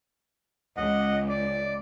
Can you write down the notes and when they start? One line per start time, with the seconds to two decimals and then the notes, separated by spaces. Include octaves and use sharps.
0.77 C#2 D#5 F#5
1.29 D5